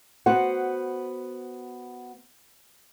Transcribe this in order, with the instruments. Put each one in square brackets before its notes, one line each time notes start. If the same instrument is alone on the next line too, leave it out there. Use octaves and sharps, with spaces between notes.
[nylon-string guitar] B3 F#4 C5 F#5